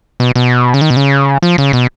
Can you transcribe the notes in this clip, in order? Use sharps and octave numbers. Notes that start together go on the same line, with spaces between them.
B2
B2
C#3
D#3
B2
C#3
F3
C#3
B2